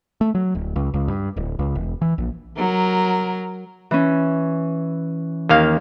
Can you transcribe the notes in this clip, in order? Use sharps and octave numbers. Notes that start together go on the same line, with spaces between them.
A3
F#3
D1
C#2
C#2
G2
D1
C#2
E1
E3
A#1
F#3 A#4
E3 C#4
D#2 A#3 F5